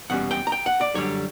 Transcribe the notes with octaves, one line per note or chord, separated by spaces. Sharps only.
E2 B2 G3 C#4 F#5
G5
A#5
G5
F#5
D5
F#2 D3 G3 C#5